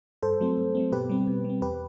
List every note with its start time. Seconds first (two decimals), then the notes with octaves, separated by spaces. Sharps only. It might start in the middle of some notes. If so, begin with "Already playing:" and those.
0.23 G2 A4 C5
0.40 F#3 A3 C4
0.57 G2
0.75 F#3 A3 C4
0.92 B2 G4 B4
1.09 G3 C4
1.27 B2
1.45 G3 C4
1.61 E2 G4 B4